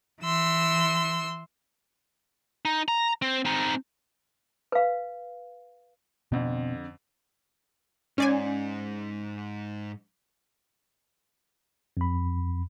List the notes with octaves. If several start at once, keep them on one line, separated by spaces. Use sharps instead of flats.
E3 C6 E6
D#4
A#5
C4
C4 D#4
B4 F5
F2 B2 D3 B3 C4
G#2 C#4 D5 G#5
F2 B5